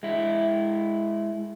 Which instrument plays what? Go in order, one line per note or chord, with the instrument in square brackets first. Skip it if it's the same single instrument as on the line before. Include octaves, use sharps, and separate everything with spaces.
[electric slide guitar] G#3 E4